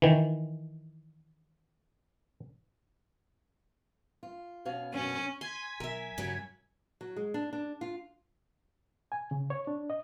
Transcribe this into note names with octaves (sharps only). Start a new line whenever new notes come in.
D#3 E3
F4
B2 C#4 F5
F#2 B2 C#4
G#5 C6 G#6 B6
B1 A#4 E5
G2 C#3 F#3 G3
F#3
G#3
D4
D4
F4
G#5
C#3
C#5
D4
D#5